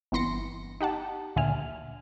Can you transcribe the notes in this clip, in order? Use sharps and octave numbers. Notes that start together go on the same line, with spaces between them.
G1 E3 B3 C6 A#6 C#7
D#4 G4 F#5 A5
D2 A#2 D3 E5 G#5 F6